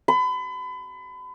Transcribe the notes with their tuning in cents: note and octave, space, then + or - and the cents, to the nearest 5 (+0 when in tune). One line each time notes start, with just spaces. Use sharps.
B5 +35